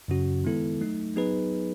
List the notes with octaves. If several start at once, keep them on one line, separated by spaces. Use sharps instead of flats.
F#2 C#3 F#3 C#4 F#4
D#3 G#3 B3 E4 A4
F#3 A3 D#4
F#3 B3 D#4 G#4 B4